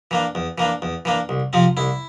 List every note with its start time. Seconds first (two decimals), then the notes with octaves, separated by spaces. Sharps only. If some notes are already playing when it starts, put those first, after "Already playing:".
0.11 E3 A#3 D4
0.35 E2
0.58 E3 A#3 D4
0.82 E2
1.05 E3 A#3 D4
1.29 C2
1.53 C3 F3 C4
1.77 C2 E4